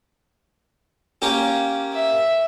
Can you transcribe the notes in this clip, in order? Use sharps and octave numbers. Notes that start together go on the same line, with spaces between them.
A#3 C#4 G4
E5